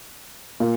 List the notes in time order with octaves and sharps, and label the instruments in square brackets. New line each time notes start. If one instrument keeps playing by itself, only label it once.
[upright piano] A#2